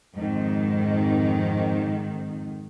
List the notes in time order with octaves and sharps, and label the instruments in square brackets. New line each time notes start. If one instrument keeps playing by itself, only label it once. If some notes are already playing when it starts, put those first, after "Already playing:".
[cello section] F2 G#2 D#3